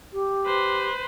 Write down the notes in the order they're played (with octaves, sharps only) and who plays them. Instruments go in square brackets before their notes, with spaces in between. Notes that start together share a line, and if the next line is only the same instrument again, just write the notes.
[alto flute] G4
[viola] B4 C5